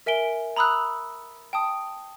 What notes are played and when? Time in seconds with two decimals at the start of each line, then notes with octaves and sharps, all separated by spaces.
0.06 A#4 E5 G#5 D7 G7
0.56 A#5 B5 D#6 E6 F#6
1.53 G5 A5 D#6